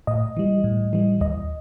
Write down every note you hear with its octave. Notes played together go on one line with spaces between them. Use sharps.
A2 D#5
E3 G3
A2
E3 G3
D#2 D#5